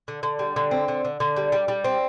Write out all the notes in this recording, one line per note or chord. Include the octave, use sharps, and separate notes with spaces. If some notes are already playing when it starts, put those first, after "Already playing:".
D3
D3
G3
D3
C4
D3
D3
D3
G3
G3
G3
C4